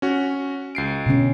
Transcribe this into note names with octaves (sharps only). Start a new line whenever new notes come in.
C#4 F#4
C#2 C7 D7
B2 D3 C#4